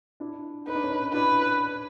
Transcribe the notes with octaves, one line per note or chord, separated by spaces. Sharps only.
D4 E4
D#4 B4
D4
C#4 D#4
D4 E4 B4